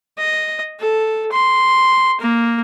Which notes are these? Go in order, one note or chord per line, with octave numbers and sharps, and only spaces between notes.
D#5
A4
C6
A#3